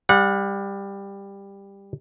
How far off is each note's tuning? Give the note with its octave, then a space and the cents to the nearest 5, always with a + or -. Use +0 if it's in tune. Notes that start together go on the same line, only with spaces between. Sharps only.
G3 +15 F#5 -25